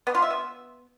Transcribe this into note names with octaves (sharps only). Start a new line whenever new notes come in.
B3
F4
E5
B3